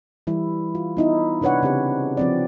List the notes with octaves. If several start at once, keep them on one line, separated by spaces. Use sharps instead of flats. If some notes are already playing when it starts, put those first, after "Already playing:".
E3 G3 E4
F4
B3 D#4 E4
C3 D4 B4 C#5 F#5
C#3 C4 G4
F3 C4 D5